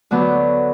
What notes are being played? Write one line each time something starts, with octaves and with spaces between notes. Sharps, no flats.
D2 D3 F#3 B3